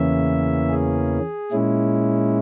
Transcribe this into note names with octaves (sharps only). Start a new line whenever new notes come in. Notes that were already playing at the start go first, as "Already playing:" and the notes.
Already playing: E2 C#3 E3 A#3 C#4 E5
G#4
A#2 G#3 C#4 E4